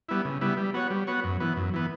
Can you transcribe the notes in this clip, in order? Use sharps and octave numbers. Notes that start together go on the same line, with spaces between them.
G3 B3 E4
C#3
G3 B3 E4
G3
B3 F#4 C#5
G3
B3 F#4 C#5
F#2
E3 B3
F#2
E3 B3